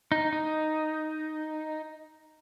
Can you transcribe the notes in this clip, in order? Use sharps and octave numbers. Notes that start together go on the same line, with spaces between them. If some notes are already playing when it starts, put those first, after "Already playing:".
D#4
D#4